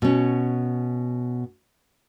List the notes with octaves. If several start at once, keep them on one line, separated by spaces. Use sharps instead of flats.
B2 C#4